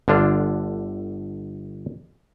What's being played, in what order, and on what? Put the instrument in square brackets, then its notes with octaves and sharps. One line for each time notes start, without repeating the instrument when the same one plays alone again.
[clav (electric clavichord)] G1 D3 D4 F4